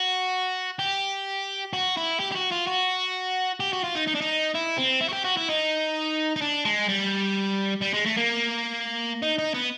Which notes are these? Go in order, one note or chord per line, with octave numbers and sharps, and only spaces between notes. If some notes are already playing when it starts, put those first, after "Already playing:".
Already playing: F#4
G4
F#4
E4
G4
G4
F#4
F4
F#4
G4
F#4
F4
D#4
D#4
D4
D#4
E4
C4
E4
F#4
G4
F#4
E4
D#4
D#4
D4
G#3
G3
G3
G#3
A3
A#3
D#4
D#4
B3